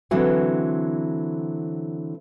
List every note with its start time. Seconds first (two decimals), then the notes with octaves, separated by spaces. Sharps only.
0.11 D3 E3 F#3 C4